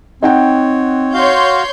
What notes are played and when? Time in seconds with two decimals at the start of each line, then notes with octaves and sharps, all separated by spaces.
0.23 C4 D#4 C#5 F#5 G5
1.13 F#4 C#5 F5 C6 G6